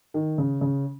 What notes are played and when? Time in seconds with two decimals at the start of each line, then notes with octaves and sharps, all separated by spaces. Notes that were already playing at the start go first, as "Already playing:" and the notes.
0.14 D#3
0.38 C#3
0.61 C#3